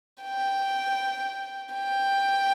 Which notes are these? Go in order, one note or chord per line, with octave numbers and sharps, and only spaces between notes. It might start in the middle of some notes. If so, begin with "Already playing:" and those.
G5
G5